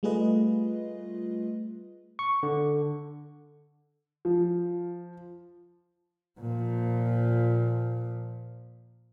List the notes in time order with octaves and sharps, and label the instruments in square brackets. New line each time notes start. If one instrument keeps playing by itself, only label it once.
[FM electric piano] G3 A3 F4 G#4 B4 D#5
[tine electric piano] C#6
D3
[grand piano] F3
[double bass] A#2 F3